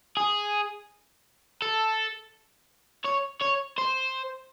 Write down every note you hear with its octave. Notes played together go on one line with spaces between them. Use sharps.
G#4
A4
C#5
C#5
C5